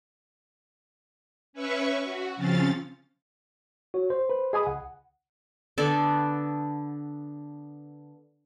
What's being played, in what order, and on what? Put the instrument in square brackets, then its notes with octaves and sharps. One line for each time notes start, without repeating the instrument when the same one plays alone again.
[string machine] C#4 B4 E5 C#6
F#4
C#3 F3 C4 C#4 F5 A6
[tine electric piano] F#4 C#5
C5
[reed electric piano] B4
[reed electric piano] G#4 G#5 D#6 [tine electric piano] D#5 B5
[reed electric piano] C#2 [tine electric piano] F#5
[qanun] D3 B3 A4 D5